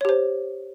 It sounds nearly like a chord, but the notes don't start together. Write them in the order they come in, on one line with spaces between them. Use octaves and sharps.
C#5 G4 C5